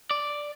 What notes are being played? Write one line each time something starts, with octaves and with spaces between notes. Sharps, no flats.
D5